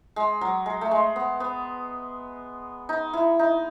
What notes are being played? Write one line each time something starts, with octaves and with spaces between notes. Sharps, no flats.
G#3
F#3
G#3
A3
G#3
B3
B3
D#4
E4
D#4